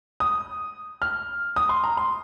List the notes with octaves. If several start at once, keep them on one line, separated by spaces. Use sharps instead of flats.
D#6
F6
D#6
C6
A#5
C6